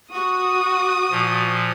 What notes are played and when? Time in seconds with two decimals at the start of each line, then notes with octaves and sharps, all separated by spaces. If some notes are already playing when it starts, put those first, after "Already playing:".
0.15 F#4 C#6 D#6
1.11 A#2 F3